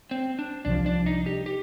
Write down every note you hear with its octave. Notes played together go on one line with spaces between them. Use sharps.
C4
D4
C2 C3 F3 D4
D4
D#4
G4
G4